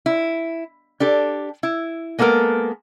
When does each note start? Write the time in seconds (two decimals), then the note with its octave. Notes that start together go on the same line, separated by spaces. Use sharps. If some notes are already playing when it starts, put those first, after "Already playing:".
0.06 E4
1.00 D4 G4 A4
1.63 E4
2.19 G#3 A#3 B3 A4 A#4